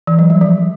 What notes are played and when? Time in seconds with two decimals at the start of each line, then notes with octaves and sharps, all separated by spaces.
0.07 E3
0.19 F#3
0.30 G3
0.41 F3